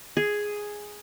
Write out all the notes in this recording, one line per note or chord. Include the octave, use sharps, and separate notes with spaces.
G#4